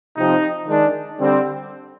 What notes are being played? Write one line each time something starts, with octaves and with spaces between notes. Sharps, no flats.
C3 F3 C4 D#4
D#3 G#3 D4
D3 G3 C4